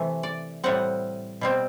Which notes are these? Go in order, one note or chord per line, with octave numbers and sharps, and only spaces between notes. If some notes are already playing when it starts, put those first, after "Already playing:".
Already playing: C3 E3 A3 E5
D5
A2 G3 C4 F#5
B2 G3 C4